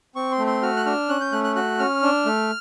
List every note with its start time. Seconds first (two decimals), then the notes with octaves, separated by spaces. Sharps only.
0.15 C4 C#6
0.32 C6
0.38 A3
0.47 C6
0.62 F#4 F6
0.76 F#6
0.86 D4 F6
1.09 C#4 F#6
1.21 G6
1.32 A3 F#6
1.44 F#6
1.56 F#4 F#6
1.79 C#4 F6
2.03 D4
2.26 A3